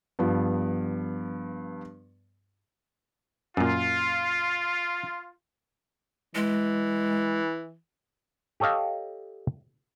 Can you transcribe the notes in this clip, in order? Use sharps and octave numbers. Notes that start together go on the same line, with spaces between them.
G2 F3 B3
F#2 A#2 F4
E3 G#3
G4 A4 C#5 D#5 F5